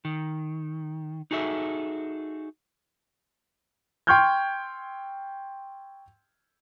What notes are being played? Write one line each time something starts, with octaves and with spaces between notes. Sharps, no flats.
D#3
D#4 F#4 G#4 A4 E5
G5 C6 C#6 F6 G6 G#6